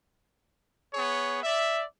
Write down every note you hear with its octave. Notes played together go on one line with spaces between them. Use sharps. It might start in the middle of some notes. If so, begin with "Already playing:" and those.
B3 G#4 C#5
D5 E5